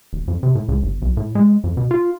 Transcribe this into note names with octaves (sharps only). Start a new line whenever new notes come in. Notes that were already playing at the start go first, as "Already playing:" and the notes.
D#1
F2
C3
A2
C#2
G1
B1
A2
G#3
F2
B2
F4